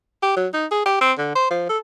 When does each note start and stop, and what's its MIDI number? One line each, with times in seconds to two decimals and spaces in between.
0.23 0.33 67
0.37 0.48 54
0.54 0.66 63
0.71 0.84 68
0.86 0.99 67
1.01 1.12 60
1.18 1.33 50
1.35 1.48 72
1.51 1.65 53
1.69 1.78 69